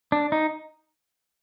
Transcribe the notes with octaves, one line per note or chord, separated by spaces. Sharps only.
D4
D#4